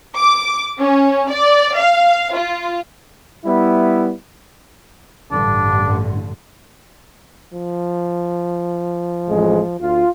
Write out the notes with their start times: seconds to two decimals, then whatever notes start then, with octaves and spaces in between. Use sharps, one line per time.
0.17 D6
0.79 C#4
1.30 D5
1.76 F5
2.34 F4
3.45 G3 B3 E4
5.31 A1 G2 D3 D4
7.53 F3
9.28 A1 F2 G#3
9.80 D2 F4